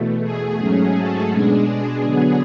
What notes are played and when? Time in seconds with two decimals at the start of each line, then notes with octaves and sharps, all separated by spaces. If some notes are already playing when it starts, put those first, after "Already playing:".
Already playing: E2 B2 A3
0.23 G#4
0.59 G#2 F#3 A3 C#4
0.95 A4
1.31 B2 G#3 D4 G#4
2.03 D3 F#3 B3